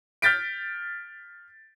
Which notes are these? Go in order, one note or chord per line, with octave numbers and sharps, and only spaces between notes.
F6 G6 A6 B6 D7